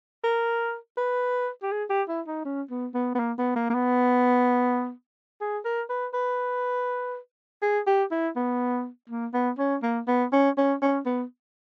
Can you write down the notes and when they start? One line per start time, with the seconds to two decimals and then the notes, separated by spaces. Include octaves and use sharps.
0.24 A#4
0.97 B4
1.62 G4
1.72 G#4
1.90 G4
2.08 E4
2.27 D#4
2.45 C#4
2.70 B3
2.94 B3
3.15 B3
3.20 A#3
3.38 B3
3.56 A#3
3.70 A#3
3.75 B3
5.41 G#4
5.65 A#4
5.90 B4
6.14 B4
7.62 G#4
7.87 G4
8.11 E4
8.36 B3
9.09 A#3
9.33 B3
9.59 C#4
9.83 A#3
10.08 B3
10.33 C#4
10.57 C#4
10.82 C#4
11.06 B3